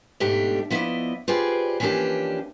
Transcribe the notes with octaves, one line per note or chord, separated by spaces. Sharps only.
G#2 B2 A3 D4 G4
F3 B3 E4 C5 D5 D#5
F4 G4 G#4 B4 C5 D5
E3 F3 A#3 C#4 D4 G4